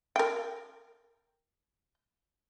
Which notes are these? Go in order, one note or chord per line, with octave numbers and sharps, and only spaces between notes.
A#4 G5